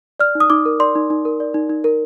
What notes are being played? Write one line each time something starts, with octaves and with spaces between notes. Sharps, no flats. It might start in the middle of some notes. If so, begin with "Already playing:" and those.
D5 F6
D#4
D#6
D#4 D6
A#4
D5 C6
D#4
D#4
A#4
D5
D#4
D#4
A#4